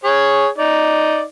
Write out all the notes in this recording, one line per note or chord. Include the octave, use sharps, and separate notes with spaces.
G#4 C#5
D#4 D5